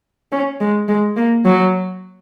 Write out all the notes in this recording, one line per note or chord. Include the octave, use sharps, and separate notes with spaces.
C#4
G#3
G#3
A#3
F#3